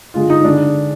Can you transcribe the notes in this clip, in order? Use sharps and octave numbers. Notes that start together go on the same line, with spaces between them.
D3 G#3 F4
D#4
D3 G#3 D4